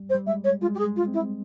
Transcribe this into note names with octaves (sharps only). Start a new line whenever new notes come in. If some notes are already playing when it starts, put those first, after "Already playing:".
Already playing: G3
C5
G3
G#3 E5
C#5
G#3 F4
G4
G#4
G#3
F4
C4
E4